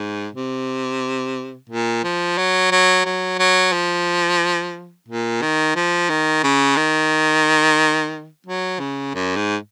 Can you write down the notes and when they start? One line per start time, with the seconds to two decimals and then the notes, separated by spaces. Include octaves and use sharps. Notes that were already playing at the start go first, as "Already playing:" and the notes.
Already playing: G#2
0.35 C3
1.69 A#2
2.04 F3
2.38 F#3
2.72 F#3
3.05 F#3
3.39 F#3
3.73 F3
5.08 A#2
5.42 D#3
5.76 F3
6.10 D#3
6.44 C#3
6.77 D#3
8.47 F#3
8.80 C#3
9.15 F#2
9.36 G#2